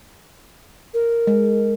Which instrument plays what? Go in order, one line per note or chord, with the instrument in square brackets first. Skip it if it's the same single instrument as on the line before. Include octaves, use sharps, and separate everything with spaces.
[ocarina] A#4
[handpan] G#3